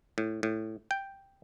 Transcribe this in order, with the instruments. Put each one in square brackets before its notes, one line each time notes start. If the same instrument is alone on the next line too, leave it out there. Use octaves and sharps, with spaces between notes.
[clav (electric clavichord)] A2
A2
G5